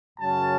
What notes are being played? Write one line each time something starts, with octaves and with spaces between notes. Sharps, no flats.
F#2 C#3 F#3 C#4 A5